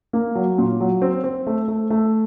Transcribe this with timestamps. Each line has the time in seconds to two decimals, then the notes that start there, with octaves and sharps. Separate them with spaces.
0.13 A#3
0.35 F#3
0.58 A#2
0.80 F#3
1.02 C4
1.24 C4
1.47 A3
1.68 A3
1.90 A3